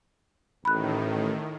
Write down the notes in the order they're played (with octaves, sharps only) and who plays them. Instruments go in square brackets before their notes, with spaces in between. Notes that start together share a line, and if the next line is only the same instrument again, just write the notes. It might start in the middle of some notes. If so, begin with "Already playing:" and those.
[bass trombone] A1 [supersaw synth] A2 D#3 [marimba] B5 F#6